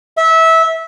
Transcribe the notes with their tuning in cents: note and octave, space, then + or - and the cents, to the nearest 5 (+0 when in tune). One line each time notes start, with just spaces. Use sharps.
E5 -20